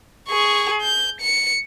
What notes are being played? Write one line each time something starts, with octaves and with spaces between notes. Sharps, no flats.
G#4 C#6
G6
C#7